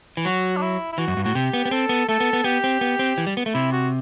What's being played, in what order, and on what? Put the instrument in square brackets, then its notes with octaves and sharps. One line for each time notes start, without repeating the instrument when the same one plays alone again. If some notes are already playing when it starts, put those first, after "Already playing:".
[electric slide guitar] E3
[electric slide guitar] F#3 [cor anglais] F#4
[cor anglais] D4
E4
E4
[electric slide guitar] E3 [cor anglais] F#4
[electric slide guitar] F#2
G2
[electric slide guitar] A2 [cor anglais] F#4
[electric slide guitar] C3 [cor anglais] G4
[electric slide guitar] B3
B3
[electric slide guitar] C4 [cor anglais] A4
[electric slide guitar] B3
[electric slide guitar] A3 [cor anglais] A4
[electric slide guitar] B3
B3
[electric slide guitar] B3 [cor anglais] G4
[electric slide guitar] C4
B3
C4
E3
G3
B3
A3
[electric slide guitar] C3 [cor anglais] E4
[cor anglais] F#4